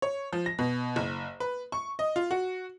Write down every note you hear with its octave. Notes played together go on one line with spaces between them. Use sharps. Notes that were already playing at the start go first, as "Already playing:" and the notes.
C#5
F3
A#6
B2
F#1
B4
C#6
D#5
F4
F#4